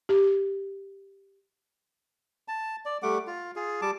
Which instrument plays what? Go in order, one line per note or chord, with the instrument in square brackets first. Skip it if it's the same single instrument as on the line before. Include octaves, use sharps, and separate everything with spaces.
[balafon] G4
[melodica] A5
D5
G3 A3 F#5 D6
F4
F4 G#4
G3 A5 D6